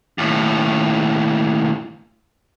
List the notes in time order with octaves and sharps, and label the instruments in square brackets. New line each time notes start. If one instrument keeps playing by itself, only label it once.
[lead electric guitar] D#2 A2